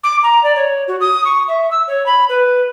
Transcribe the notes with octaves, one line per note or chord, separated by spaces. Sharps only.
D6
A#5
D5
C#5
F#4
D#6
C#6
E5
E6
C#5
B5
B4